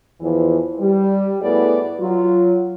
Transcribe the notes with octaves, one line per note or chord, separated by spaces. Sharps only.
E2 E3 F3
G3
A2 B3 E4 F#4 G#4 D5
F#3 F4